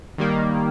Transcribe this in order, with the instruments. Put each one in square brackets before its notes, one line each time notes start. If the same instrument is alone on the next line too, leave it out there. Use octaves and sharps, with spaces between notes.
[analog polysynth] D#3 G3 A#3